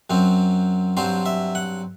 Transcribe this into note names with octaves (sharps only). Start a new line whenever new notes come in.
F#2 F#3 C4
G2 F#3 C4 C5
E5
F#5